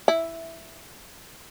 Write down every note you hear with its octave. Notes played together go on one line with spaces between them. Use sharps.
E4